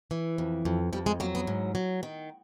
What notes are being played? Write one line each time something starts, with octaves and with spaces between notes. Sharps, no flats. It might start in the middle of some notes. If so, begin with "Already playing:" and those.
E3
F2
F2
F2 G3
G#3
F#3 A#3
B3
G#2
F#3
D#3